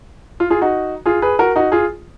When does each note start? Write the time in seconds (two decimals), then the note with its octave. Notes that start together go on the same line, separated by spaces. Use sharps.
0.40 F4
0.50 F4 G#4
0.62 D#4 F#4
1.06 F4 G#4
1.22 G#4 B4
1.39 F#4 A#4
1.56 D#4 F#4
1.72 F4 G#4